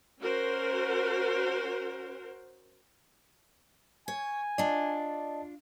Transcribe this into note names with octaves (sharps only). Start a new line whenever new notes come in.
C#4 F#4 A#4 C5
C#5 G#5
D4 F4 D5 D#5 A5